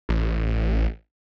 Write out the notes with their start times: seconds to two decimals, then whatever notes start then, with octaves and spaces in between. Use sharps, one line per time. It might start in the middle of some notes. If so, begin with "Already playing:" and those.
0.09 A1